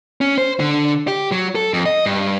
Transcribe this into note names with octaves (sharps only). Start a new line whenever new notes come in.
C#4
C5
D3
G4
F#3
A4
F2
D#5
G2